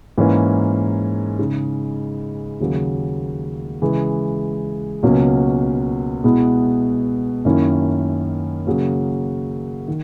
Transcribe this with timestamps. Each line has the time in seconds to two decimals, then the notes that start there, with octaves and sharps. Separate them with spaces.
0.18 G#2 E3 A#3 C#4
1.39 C#3 G#3 D#4
2.60 D#2 C#3 F#3 A#3
3.82 C#3 E3 G#3
5.03 C#2 B2 F#3 A#3 C#4
6.24 B2 G#3 B3 E4
7.45 F#2 D#3 A#3 C#4 E4
8.67 C#3 F#3 A#3
9.88 D#3